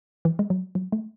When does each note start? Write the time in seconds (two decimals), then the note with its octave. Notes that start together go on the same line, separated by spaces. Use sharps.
0.25 E3
0.39 G#3
0.50 F#3
0.75 F#3
0.92 A3